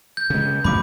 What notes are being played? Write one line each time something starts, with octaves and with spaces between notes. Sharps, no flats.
G6
C#3 G#3
F2 A2 F#3 B5 D6